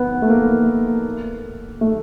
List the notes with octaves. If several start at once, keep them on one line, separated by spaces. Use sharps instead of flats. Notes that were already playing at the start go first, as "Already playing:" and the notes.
Already playing: B3
A3
A#3
A3